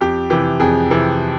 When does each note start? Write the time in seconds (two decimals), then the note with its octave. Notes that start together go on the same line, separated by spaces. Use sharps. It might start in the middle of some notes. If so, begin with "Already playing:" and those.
0.01 F2 G4
0.30 C3 E3 G4
0.60 F2 G#4
0.91 C3 E3